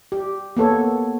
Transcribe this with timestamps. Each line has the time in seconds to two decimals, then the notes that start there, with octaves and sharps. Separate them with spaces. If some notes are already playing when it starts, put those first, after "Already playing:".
0.12 G4
0.57 A#3 B3 A4 C#5